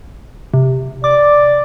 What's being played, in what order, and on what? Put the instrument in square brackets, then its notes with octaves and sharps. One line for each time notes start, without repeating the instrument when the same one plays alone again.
[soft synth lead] C3
[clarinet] D5 [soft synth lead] D6